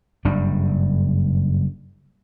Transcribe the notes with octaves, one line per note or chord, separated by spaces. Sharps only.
F#1 G2 G3 D4